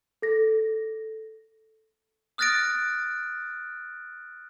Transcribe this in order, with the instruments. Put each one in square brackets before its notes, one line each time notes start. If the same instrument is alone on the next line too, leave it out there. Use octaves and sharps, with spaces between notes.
[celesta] A4 A#6
[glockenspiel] D#6 F6 F#6 A6 A#6 D7